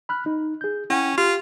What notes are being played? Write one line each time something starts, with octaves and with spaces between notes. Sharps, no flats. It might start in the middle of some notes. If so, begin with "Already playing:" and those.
B5 F6 F#6
D#4
G#4 G6
C#4 E4 F#5 G5
F4 G4